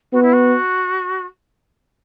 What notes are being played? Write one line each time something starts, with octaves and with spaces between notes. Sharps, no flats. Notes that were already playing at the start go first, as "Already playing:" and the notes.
B3 F#4
E4
F#4